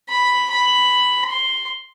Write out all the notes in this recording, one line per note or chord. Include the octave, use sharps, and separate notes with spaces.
B5
B5
C6